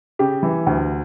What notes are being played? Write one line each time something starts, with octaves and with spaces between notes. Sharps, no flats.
C#3 G4
E3
D2